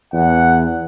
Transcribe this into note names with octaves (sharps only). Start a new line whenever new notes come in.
E2 F#5